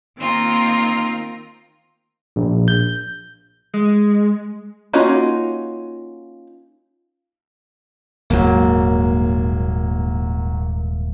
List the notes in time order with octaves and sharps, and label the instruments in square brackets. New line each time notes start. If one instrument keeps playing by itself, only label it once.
[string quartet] D#3 A#3 C4 F4 A#4
[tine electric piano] A#1
G6
[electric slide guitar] G#3
[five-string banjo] A#3 C#4 D#4 F4 F#4
[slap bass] D#1 D#2 G#2 [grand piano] F#3 A#3